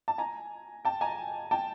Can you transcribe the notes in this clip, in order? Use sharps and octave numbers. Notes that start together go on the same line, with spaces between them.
A5
G#5 A#5
G5 A5
G#5 A#5
G5 A5